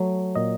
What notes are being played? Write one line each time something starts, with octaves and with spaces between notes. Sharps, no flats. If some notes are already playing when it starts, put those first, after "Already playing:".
Already playing: F#3 A3
A#2 D#5